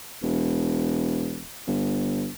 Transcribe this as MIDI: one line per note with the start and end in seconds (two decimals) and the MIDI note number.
0.22 1.44 28
1.67 2.29 31